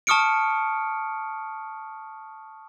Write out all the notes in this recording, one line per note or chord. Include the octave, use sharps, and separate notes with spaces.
A5 C#6 D#6 F6 C#7 D7